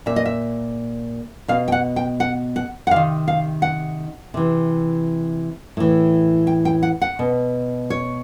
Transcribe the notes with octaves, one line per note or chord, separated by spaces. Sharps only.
A#2 E5
D#5
E5
B2 F5
G5
F#5
G5
F#5
F#5
F#5
C3 D#3 F5
F5
F#5
C3 E3
A2 E3
G5
G5
F#5
F#5
B2
C#5